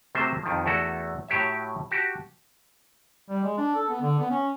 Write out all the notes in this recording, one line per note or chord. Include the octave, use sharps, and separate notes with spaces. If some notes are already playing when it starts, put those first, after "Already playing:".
C3 F#3 A3 A#3 C5 E5
F2 D#3 F3
E2 A3 E4 F#4 A4
A2 F#3 G4 C#5 E5
F#4 G4 A5
G3
G#3
D4
A4
B3
D3
B3
C#4